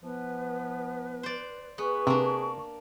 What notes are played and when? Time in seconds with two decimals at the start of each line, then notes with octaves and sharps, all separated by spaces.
0.03 E3 F3 B3 B4
1.23 C5 D5
1.78 B3 G#4 B4 C#6
2.07 C3 A#3 D4